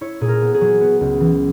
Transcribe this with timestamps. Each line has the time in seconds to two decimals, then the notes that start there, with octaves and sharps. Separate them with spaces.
0.01 E4 C#5
0.21 A#2 G#4
0.28 A#4
0.41 B3
0.54 G#4
0.61 F#3
0.81 B3
1.01 C#2
1.20 E3